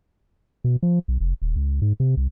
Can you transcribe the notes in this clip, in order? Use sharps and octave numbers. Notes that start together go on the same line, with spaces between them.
B2
F3
B1
F1
D#1
C#2
G#2
C3
C2